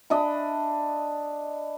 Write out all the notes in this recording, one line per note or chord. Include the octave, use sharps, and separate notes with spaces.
D4 D#5 E5 B5